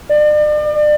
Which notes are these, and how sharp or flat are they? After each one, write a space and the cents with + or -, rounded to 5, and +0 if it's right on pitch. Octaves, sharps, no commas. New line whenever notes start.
D5 +40